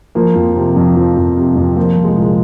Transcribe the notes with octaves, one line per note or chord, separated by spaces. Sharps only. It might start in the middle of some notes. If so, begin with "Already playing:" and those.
F3 A#3
F2
C3
F2
F3
F2
C3
F2
F3 A#3
C2
G#3
A#2